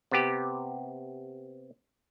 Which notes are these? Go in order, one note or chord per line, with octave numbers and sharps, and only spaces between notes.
C3 B3 G4